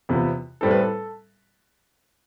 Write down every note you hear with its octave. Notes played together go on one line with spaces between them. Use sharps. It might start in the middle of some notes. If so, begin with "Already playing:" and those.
E2 C3 F3 B3
A2 G3 C4 E4 A4
B4
A4